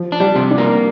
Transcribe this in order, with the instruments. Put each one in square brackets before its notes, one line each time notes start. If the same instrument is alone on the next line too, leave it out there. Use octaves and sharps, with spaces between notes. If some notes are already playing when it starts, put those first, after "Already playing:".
Already playing: [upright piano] F3
[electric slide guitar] D4
[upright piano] G3
[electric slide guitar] C3
[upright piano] D4
[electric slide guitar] A#3